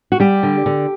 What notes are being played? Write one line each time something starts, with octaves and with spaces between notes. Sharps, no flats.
F#4
G3 G4
D3
D3